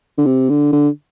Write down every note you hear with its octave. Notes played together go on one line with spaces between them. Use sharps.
D3
C3
D3
D3